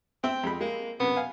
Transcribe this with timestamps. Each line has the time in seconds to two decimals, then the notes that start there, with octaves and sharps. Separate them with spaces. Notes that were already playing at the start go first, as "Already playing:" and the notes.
0.24 C4 E5 G5
0.43 F2 G#3 B5
0.61 G#3 A#3
1.00 F#2 C3 B3
1.16 F5 G#5